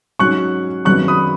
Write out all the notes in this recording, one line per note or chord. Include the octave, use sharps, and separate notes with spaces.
G#2 F#3 C#4 C#6 F#6
G#1 F#2 F#3 B3 C#6 F#6
B5 D#6